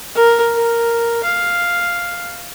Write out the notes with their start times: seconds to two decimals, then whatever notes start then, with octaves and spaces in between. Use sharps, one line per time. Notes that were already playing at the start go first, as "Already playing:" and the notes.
0.15 A#4
0.55 A#4
1.24 F5